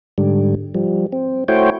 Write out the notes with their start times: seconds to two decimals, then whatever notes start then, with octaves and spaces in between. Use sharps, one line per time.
0.18 G#2 D3 G3
0.75 F3 G3
1.12 C4
1.48 A3 E4 F#4 C5 C#5 G5